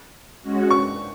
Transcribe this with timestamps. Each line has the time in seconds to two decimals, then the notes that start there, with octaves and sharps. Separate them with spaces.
0.43 G#3 C#4 F#4
0.71 C#6